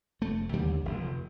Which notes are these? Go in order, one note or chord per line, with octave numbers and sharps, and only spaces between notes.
F1 A3
D#2 D3 G3
F1